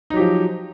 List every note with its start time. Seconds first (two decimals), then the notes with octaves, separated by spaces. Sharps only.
0.10 D#4
0.13 F#3
0.17 G4
0.20 F3